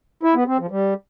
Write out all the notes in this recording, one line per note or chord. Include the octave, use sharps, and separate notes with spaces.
E4
B3
C4
F3
G3